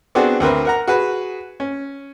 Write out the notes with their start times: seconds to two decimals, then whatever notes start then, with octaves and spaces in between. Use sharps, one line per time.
0.15 B3 C4 D4 F#4 G#4
0.40 D2 C4 A#4 B4
0.65 A#4 F#5 A#5
0.88 F#4 G#4 B4
1.60 C#4